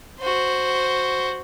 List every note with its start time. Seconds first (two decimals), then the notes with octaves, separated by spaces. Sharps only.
0.20 F#4 C5